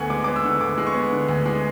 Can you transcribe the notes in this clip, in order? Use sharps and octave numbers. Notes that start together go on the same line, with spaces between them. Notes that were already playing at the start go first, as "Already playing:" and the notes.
Already playing: D2 D3 B3 F#5 G#5
G#3 D6
B3 D6
E6
D3
D2 D6
G#3
C#6
B3
D3
D2
G#3